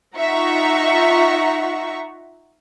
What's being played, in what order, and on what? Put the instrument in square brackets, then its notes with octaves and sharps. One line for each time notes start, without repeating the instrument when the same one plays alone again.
[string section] D#4 F4 E5 F#5 A#5 C#6